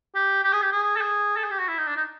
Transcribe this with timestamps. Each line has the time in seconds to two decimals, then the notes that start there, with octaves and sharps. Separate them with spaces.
0.15 G4
0.44 G4
0.53 G#4
0.62 G4
0.72 G#4
0.96 A4
1.01 G#4
1.36 A4
1.44 G#4
1.51 G4
1.59 F#4
1.68 E4
1.78 D#4
1.87 D4
1.97 D#4